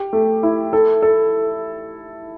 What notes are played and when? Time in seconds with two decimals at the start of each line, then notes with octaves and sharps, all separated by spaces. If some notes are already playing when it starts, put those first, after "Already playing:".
Already playing: G4
0.13 A3
0.43 E4
0.73 A4
1.02 A4